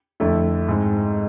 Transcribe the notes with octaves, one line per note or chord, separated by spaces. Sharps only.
F2 D3 A3 E4
G#2 G#3 C4